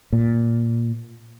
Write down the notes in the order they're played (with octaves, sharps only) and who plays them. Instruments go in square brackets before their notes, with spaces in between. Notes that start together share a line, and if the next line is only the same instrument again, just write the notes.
[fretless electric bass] A#2